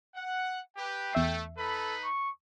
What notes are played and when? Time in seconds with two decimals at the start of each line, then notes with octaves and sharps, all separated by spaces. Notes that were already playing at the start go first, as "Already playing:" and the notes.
0.15 F#5
0.77 G4 B4 G5
1.13 E2 A3 E5 C7
1.58 D#4 A4 B4 B5
2.05 C#6